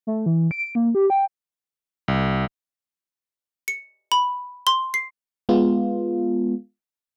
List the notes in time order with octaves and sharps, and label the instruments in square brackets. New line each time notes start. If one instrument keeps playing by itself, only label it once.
[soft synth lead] A3
E3
D7
A#3
G4
G5
[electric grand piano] C2
[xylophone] C#7
B5
C6
C7
[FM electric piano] G#3 B3 F4